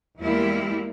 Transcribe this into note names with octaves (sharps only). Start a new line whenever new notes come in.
E2 G3 G#3 A#3 E4 G4